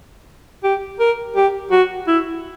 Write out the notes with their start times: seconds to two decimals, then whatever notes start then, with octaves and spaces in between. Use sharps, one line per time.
0.63 G4
1.00 A#4
1.36 G4
1.71 F#4
2.07 E4